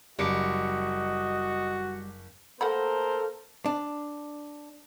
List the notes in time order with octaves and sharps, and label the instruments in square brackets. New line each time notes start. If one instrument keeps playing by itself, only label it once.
[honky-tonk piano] F#1 C#7 [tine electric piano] G3 D6 [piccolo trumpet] F#4 [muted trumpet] D#5
[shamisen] A3 F#5 B5 [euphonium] A#3 [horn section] A4 A#4 [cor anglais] C5
[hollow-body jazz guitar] D4